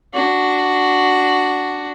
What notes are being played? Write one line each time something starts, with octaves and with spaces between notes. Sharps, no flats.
D4 F#4